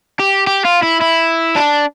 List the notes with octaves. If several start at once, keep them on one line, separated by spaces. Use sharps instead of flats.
G4
G4
F4
E4
E4
D4